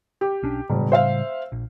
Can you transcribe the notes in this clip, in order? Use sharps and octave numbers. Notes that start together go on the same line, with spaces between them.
G4
B1 C#4 D4
E1 A2 C#3 G3
C5 E5 F5
A#1